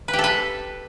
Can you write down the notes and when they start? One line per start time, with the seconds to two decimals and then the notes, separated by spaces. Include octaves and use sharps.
0.08 B4
0.13 G4
0.19 A4
0.24 B4